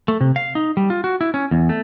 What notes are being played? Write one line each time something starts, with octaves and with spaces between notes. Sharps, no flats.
A3
C3
F5
D#4
G3
F4
F#4
E4
C#4
E2
A3